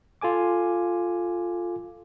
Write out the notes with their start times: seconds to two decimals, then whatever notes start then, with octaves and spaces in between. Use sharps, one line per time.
0.21 F4 A4 G#5 D6